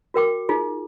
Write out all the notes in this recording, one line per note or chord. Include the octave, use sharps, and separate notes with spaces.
F#4 A#4 G5 D6
D#4 F4 G#4